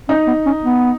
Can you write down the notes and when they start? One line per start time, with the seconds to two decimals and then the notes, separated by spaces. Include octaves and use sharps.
0.09 C#4 D#4
0.27 B3
0.46 C#4
0.64 B3